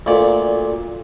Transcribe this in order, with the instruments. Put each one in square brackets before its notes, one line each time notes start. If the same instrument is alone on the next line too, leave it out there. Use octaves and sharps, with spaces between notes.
[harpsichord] D2 A#2 D5